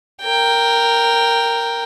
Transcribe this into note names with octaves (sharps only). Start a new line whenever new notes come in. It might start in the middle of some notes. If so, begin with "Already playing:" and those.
A#4 G5